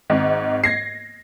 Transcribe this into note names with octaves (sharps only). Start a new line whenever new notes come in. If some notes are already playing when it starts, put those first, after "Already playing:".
G#1 G#2
G#6 A#6 C7